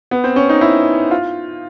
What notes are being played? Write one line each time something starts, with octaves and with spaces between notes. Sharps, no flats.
B3
C4
C#4
D#4
E4
F4